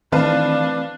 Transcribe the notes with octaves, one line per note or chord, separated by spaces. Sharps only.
D#3 E3 A3 C4 D4 B4 F5 A5